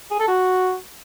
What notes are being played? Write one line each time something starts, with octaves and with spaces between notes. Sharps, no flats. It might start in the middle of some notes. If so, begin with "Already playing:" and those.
G#4
A4
F#4